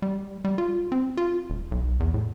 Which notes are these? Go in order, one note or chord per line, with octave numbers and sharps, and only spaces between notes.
G3
G3
F4
C4
F4
D#1
B1
E2
A2